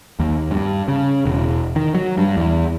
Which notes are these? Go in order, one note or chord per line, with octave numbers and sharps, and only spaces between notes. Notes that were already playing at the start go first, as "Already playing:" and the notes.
D#2
G2
C#3
E1
D#3
F#3
G2
E2